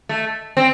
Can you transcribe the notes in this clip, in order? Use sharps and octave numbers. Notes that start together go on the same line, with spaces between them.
A3
C4